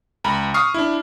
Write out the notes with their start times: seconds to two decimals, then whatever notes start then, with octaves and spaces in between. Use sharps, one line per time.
0.24 C#2 A#5 B5
0.54 C#6 D#6 F6 C7
0.74 D4 E4